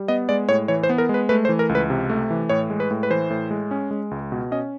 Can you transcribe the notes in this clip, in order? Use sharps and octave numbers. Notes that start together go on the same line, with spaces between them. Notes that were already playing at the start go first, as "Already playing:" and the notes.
Already playing: G3
B3 D#5
G#3 D5
A2 C#5
E3 C#5
C5
B3
A#4
G#3
B4
A3 B4
C5
E3
A#4
C#2
B4
C3
A3
E3
A2 C#5
G#3
B4
A2
B4
E3 C5
A2
G#3
C#4
G#3
C#2
B2
C#4 D#5